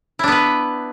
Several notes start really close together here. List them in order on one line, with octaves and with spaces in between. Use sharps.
E4 D4 B3 B4